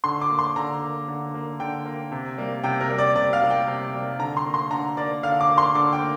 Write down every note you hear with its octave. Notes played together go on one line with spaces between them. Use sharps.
D3 C6
D6
A#3
C6
D3 A#5
A#3
D3
A#3
D3 G5
A#3
C3
G3 A#3
C3 G5
A#4
G3 A#3
D5
C3 D5
F5
G3 A#3
G5
C3
G3 A#3
D3 A#5
C6
A#3
C6
D3 A#5
A#3 D5
D3 F5
D6
A#3
C6
D3 D6
G5
A#3